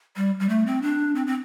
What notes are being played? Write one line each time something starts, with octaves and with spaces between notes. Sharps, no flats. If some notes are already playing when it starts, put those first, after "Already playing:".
G3
G3
A3
C4
D4
C4
C4